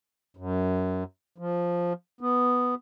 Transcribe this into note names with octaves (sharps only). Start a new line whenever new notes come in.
F#2
F3
B3